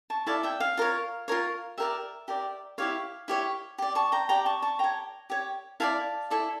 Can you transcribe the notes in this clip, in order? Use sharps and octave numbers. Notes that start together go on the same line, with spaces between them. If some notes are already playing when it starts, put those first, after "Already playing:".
A5 C#6
E4 A4 D5 F5 A5
E5 G5
F5
F4 A#4 C#5
F4 A#4 C#5
G4 A#4 D5 E5
G4 A#4 D5
E4 G4 C#5 F5
E4 G4 C#5
G4 D5
A5 C#6
G5 A#5
G4 D5 G5 A#5
A5 C#6
A5 C#6
G4 C#5 G5 A#5
G4 C#5
E4 A4 D5 F5 A5
E4 A4 D5